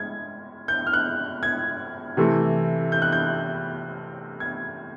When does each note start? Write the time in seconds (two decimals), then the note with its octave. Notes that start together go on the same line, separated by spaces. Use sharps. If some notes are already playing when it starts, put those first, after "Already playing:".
Already playing: G#3 G#6
0.68 G6
0.87 F6
0.93 F#6
1.43 G#6
2.17 C3 E3 A3
2.92 G6
3.02 F#6
3.12 G6
4.40 G#6